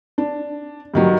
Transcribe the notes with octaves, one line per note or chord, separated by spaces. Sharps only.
D4
G2 D#3 F#3 G3